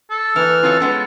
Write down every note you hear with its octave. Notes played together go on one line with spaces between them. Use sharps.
A4
E3 A#3 E4 F6
C4 F4 A4 C#5
G#3 B3 C#4